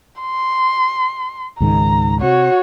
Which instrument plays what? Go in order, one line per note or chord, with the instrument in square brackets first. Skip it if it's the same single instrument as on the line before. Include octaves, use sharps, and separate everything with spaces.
[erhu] C6
[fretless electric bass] C#2 G#2 D#3 [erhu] A#5
[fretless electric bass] C3 [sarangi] F#4 [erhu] C#5